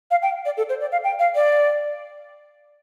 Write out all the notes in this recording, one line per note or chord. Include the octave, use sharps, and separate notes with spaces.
F5
G5
D5
A4
C5
D5
F5
G5
F5
D5